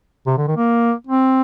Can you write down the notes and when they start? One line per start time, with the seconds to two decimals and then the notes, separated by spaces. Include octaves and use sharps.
0.27 C3
0.38 D3
0.48 D#3
0.57 A#3
1.07 C4